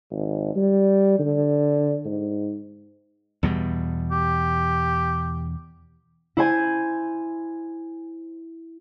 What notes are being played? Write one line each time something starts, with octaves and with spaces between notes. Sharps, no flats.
G#1
G3
D3
G#2
E2 B2 G3
G4
E4 C5 G#5